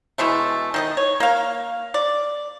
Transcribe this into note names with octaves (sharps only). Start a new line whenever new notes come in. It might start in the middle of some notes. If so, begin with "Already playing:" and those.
B2 E3 G#3 A3
D#3 G#4 D#5
C#5
A#3 F5
D5